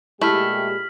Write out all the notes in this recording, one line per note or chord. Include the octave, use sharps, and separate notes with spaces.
A#2 G#3 A3 E4 G4 F6 B6 F#7